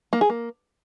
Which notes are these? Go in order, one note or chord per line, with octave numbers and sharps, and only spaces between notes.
A#3
G#4
A#3